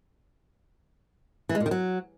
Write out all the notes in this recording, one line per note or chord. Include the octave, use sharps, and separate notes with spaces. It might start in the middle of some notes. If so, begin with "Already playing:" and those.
E3
G#3
A#2
D#3
F#3